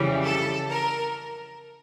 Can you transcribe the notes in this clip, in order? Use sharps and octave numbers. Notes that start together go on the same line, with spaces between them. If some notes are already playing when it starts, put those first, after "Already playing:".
Already playing: F2 C#3 E3 G3
A4
A#4